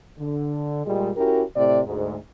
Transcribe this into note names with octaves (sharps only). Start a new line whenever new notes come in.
D3
A#2 G3 G#3
C#4 E4 F#4 G4 A#4
A2 C3 D5
D2 G#2